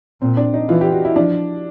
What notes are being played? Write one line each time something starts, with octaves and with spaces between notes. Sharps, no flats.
A#2 C4
D4
D#4
E3 F4
G4
F#4
E4
F3 D4